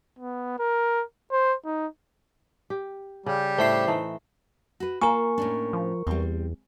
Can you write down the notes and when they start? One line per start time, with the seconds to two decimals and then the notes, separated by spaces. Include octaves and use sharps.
0.19 B3
0.59 A#4
1.32 C5
1.65 D#4
2.70 G4
3.26 C#3 G3
3.58 A2 A3 C5 E5 C7
3.87 E3 A3 D#4
4.80 F#4 B4
5.02 A#3 F4 A#4 G#5 A#5 C#6
5.38 A2 C#4 D4
5.73 F3
6.07 E2 G3 C4